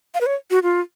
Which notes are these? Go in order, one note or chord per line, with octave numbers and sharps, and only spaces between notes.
F5
B4
C#5
F#4
F4